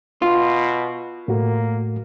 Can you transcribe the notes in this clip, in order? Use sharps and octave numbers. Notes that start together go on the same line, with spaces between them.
B2 F4
A2 A3 A#3 F#4